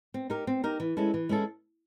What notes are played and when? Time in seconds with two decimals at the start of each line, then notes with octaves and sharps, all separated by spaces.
0.14 C4
0.30 D#4 G4 A#4
0.47 C4
0.64 D#4 G4 A#4
0.80 E3
0.97 G#3 C#4 E4 A4
1.14 E3
1.29 G#3 C#4 E4 A4